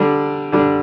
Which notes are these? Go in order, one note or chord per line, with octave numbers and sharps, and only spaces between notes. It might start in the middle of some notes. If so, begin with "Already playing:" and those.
Already playing: D3 G3 D4
D3 G3 D4